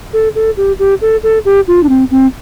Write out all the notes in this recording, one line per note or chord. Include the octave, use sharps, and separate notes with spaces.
A4
A4
G4
G4
A4
A4
G4
F4
D4
C4
C4